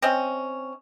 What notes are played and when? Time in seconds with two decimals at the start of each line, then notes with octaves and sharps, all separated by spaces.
0.02 C4 C#4 D#5